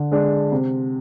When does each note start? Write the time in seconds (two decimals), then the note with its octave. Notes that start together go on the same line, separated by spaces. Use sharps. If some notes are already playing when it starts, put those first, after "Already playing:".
Already playing: D3
0.12 G#3 D4
0.52 C3